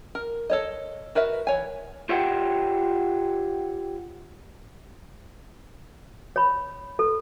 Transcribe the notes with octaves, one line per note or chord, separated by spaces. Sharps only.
A#4
A4 C#5 D#5
F#4 A#4 B4 E5
E3 C#5 G#5
F4 G4 C#5 E5 F#5 G5
C#5 B5
A4